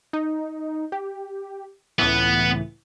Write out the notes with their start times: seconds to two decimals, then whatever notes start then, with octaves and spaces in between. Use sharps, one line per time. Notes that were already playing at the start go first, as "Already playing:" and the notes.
0.13 D#4
0.92 G4
1.99 C#2 A2 E3 B3